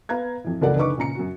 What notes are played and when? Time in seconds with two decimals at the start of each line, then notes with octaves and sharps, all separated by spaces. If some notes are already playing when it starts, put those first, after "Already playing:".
0.09 B3 F5 A#5 G#6
0.44 F2 A2
0.61 F#1 C#2 A3 A#4 D5 F#5
0.76 F#1 D3 D#4 B4 C#6 D6
0.98 A#2 C#3 A#5 C#7
1.15 F#2 F#4